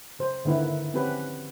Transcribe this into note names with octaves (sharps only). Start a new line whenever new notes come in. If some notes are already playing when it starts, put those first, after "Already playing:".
C#3 C5
D3 D#3 A#3 E4 B4
C4 C#4 G4 B4